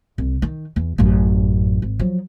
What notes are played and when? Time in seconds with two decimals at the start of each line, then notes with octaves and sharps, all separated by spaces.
0.18 C2
0.42 D#3
0.76 E2
0.98 A1 F#2
1.82 G#1
1.99 F3 F#3